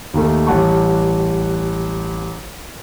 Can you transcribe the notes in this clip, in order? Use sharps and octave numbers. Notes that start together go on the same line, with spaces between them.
D#2 D#3 A3
A1 G3 F#5 A5 C#6